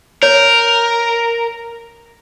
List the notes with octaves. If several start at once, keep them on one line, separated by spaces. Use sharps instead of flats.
A#4 C#5